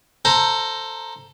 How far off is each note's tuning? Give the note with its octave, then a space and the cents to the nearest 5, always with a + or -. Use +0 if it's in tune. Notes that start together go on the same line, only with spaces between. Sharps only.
A4 +15 C5 +0 A#5 +0